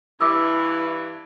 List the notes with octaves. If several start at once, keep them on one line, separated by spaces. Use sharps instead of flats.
G2 E3 E4 D6 E6